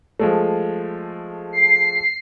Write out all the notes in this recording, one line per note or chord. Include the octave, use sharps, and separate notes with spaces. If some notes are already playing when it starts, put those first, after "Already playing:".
F3 G#3 A3
C7